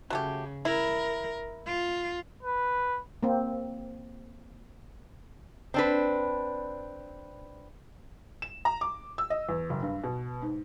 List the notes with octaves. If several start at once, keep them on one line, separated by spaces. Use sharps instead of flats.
C#3 F#3 A3 G4
E4 A#4
F4
B4
A#3 C4
C4 D4 B4
E7
A#5
D6
E6
D#5
E2
F#1
G2
B2
G#2